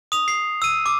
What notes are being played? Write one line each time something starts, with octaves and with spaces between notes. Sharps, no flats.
D#6 F7
C7
E6 D#7
D6